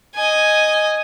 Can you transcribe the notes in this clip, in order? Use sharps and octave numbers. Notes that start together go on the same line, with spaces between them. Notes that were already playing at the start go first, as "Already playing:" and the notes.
D#5 G#5